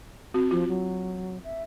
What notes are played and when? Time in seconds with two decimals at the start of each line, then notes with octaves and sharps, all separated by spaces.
0.34 C4 F#4
0.51 F3 F4
0.68 F#3
1.44 E5